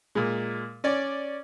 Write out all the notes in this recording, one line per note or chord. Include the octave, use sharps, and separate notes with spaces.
A#2 G#3
C#4 D5